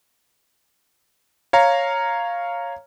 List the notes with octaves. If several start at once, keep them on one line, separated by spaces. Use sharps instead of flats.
C#5 F5 A#5